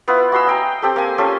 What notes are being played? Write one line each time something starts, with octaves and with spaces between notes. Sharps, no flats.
B3 E4 F4 B4
F#4 G#5 C6 E6
D#5 G5 A#5
C4 G4 A4
A#3 G#5
C#4 F4 G4 A4